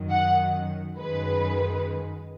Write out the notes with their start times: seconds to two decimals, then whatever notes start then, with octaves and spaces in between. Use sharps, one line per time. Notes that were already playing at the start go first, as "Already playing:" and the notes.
Already playing: F#2 D#3 F#3
0.10 F#5
0.98 F#2 D#3 G#3 B4